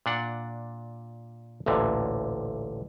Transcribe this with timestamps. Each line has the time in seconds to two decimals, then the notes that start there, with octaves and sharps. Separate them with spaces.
0.06 A#2 D4 F#5
1.66 A1 D2 A#2 D3